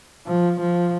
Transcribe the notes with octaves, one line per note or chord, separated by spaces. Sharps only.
F3
F3